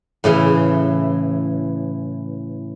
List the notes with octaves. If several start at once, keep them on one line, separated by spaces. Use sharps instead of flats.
A2 C#3 E3